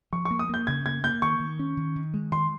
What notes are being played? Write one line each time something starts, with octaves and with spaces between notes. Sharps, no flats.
F3 C#6
C#6
A#3
D#6
A#3 G6
C#3 G#6
A#3 G#6
A#3 G6
D#3 C#6
D#3
C#4
D#3
D#3
G#3
D#3 C6